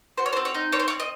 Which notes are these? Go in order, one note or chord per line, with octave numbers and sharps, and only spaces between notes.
F#4 C5
C#5
C5
C4
C#5
D#4
C4 C#5
C5
C4 C#5
D#5